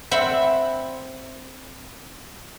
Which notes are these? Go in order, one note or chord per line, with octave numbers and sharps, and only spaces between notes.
C4 E5 F#5 B5